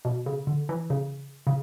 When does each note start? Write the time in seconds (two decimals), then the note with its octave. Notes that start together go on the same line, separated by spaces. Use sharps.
0.05 B2
0.26 C#3
0.47 D3
0.69 E3
0.90 C#3
1.47 C#3